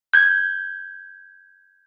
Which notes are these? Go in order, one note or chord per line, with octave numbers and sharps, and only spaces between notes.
G6 G#6